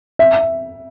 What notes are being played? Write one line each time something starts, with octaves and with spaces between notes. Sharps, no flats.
E5